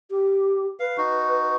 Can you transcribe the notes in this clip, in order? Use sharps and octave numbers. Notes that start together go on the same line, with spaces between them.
G4
B4 F5
D#4 F#4